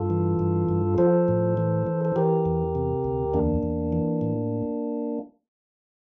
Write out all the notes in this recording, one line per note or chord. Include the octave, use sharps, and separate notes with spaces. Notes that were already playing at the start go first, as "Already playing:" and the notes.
Already playing: G2 F4 A4
E3
G2
G2
F3 A4 C5
A2
E3
E3
A4
E3 G4 A#4
E2
C3
D2
E2 A#3 D4
E2
E3
A2